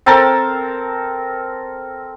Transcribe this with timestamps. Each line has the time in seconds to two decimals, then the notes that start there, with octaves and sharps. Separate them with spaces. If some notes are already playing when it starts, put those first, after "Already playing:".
0.06 C4 A4 A#4 A5